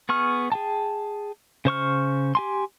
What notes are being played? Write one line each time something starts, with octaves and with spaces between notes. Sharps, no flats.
B3 G#4 C#6 F6
G#4 G5 A5
C#3 C5 C#6 F6
G4 G#5 C6